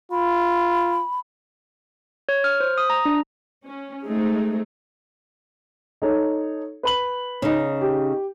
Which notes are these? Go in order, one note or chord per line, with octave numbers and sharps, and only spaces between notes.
F4 B5
C#5
F6
C5
D#6
A#5
D4
C#4
G#3 A3 C4 D#4 G#4
D#4 A4 C#5
B4 B5 F#7
C#3 D#4
G4